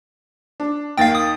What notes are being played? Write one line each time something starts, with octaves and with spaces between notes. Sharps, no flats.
D4
D#2 D#3 F5 G5 A6
D#6